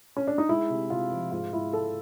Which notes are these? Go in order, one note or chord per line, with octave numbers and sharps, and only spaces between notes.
C#4
D4
D#4
G#3 E4
C3
C3 F4
F3
G#2 F4
G#2 E4
G#2 A4